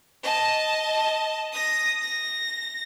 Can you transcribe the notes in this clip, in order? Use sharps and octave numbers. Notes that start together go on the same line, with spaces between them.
D#5 A5
D#6 A#6
A#6